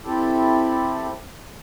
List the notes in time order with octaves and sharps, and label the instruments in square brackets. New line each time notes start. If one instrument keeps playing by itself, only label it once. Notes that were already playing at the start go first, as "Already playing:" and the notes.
[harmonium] C4 E4 G4 A4